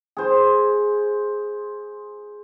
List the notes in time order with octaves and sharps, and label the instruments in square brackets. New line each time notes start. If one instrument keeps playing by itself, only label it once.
[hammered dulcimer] G#4 C5